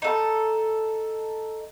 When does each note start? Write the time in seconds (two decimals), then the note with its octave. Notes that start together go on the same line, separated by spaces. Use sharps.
0.02 D#4 A4